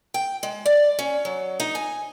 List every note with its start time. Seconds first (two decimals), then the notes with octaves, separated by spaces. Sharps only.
0.14 G5
0.43 G#3
0.66 D5
0.99 C#4
1.25 F#3
1.60 D#4
1.75 G#5